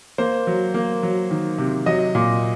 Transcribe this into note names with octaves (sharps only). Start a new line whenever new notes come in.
A#3 C5
F#3
A#3
F#3
D#3
C3
F#3 D#5
A#2